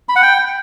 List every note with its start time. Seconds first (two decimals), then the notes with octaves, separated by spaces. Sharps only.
0.09 B5
0.16 F#5
0.22 G5